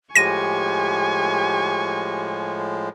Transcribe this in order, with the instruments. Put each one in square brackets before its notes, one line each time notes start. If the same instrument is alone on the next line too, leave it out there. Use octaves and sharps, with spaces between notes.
[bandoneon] A2 F3 G#3 [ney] G4 [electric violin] G#5 C#6 [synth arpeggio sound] A#6 D#7